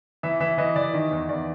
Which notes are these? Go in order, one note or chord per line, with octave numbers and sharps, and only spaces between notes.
E3 E5
E3 E5
E3 D#5
E3 D5
D#3 D#5
E2
E2 D5